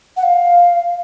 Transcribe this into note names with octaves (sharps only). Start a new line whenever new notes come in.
F#5
F5